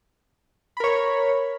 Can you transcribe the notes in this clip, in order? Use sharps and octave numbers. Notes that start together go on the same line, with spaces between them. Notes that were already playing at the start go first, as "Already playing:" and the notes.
A#4 C#5 B5